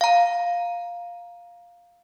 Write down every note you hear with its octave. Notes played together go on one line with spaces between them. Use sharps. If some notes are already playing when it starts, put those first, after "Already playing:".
F5 A#5